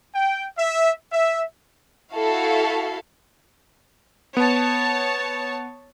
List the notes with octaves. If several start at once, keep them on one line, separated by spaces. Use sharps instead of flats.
G5
E5
E5
E4 F#4 A4 F5
B3 C#5 A5